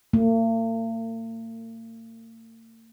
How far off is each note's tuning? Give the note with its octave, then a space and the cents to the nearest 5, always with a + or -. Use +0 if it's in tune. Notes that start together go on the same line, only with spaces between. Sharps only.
A#3 -45